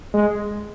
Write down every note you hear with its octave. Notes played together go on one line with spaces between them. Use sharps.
G#3